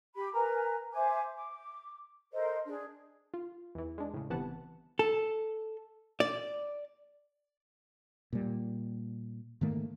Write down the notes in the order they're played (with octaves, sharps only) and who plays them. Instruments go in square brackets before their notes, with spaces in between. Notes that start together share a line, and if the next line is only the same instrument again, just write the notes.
[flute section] G4 B5
A#4 B4 G#5 A#5
C5 E5 G#5 D6
D6
A4 A#4 C5 D#5
D4 G#4
[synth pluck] F4
E2 E3
G#3 D4
A2 C#3
G1 C3 E3 B3 F#5 A5
[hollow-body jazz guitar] A4
D5
[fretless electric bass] A#2 G3
G#2 D#3 A3 A#3